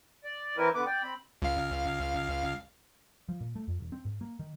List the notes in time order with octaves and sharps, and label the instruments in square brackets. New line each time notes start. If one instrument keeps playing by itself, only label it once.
[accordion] D5
E3 C4 E4 A#4 B4
D3 B3 B4 D6
D5 G5
C4 B5
[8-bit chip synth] C#2 F5
[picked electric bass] F3
A#2
A3
F2
E1
C4
G#2
A#3
D#3